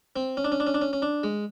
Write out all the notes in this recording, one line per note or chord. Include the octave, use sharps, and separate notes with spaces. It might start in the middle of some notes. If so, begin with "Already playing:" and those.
C4
C#4
D4
C#4
D4
C#4
D4
C#4
C#4
D4
G#3